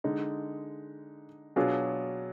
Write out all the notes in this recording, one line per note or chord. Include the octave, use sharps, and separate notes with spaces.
D3 G#3 D#4
B2 F#3 D4 F4 G#4